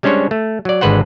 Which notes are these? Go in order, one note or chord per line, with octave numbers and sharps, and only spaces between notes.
G3 G#3 C#4 D4 C5 C#5
A3
F#3 D5
G#1 D3 G#3 B4 C5 F#5